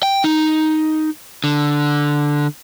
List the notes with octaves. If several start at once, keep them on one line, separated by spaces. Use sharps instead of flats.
G5
D#4
D3